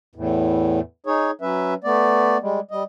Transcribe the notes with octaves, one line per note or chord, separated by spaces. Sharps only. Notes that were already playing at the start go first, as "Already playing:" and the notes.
E2 A2
D#4 G#4 C#5
F#3 C#4 B4 E5
A3 B3 D5
G3 G#3
G3 D#5